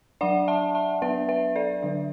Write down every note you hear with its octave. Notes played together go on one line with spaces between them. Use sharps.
F#3 D4 D5 F#5
E5 A5
E5 A5
F#3 B3 D4 B4 E5
B4 E5
A4 D5
D3 F#3 D4